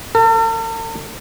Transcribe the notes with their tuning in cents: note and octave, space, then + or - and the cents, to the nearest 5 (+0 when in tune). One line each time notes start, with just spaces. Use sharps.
A4 +45